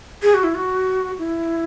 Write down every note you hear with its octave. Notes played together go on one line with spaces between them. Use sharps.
G#4
F#4
E4
F#4
E4